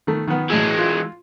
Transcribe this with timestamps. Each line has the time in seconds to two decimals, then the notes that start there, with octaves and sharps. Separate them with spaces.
0.07 D#3 A3
0.28 D#3 B3
0.50 A2 E3 G#3 G#4
0.78 F4